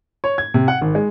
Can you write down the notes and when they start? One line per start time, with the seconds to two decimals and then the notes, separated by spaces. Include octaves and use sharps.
0.24 C#5
0.38 G#6
0.54 C3
0.68 F#5
0.81 G#1
0.95 G#3